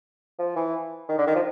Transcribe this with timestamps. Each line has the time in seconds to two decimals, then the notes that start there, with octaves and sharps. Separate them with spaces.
0.39 F3
0.56 E3
1.09 D#3
1.18 D3
1.27 D#3
1.35 F3